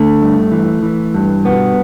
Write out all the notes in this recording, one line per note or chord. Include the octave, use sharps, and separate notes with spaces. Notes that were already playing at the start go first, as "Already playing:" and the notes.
Already playing: D3 A3
G2
E3
E3
G2
B2 B3